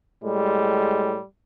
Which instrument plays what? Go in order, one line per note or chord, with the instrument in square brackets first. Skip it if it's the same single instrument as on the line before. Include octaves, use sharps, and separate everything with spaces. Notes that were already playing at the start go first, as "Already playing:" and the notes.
[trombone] A2 [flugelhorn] G3 [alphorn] G#3